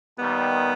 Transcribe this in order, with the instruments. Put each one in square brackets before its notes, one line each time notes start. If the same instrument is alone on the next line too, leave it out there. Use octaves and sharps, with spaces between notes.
[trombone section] D#2 D#3 G3 [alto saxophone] B3